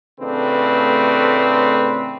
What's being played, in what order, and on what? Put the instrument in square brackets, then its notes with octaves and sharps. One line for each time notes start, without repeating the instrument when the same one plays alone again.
[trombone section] A1 C#3 A3 C4 D4 B4